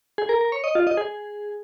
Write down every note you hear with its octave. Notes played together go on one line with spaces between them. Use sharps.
G#4
A#4
A#4
C#5
D#5
F4
D#5
G#4